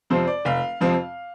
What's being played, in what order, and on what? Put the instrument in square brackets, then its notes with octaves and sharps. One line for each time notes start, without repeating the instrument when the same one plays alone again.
[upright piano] F2 C3 F3 C4 C5
D5
F1 F5
F2 C3 F3 C4